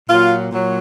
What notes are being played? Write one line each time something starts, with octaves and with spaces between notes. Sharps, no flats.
A#2 F#3 F4
A#2 F#3